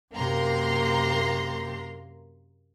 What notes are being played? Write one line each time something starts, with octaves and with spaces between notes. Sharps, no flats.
F#2 C3 A#3 A#5 C6